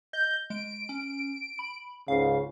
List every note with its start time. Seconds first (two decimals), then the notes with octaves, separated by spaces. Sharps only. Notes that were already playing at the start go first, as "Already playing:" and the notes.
0.13 D#5 G6
0.50 G#3 D7
0.89 C#4
1.59 B5
2.08 C#2 G#2 C#3 F5